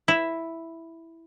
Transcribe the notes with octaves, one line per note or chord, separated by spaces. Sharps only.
E4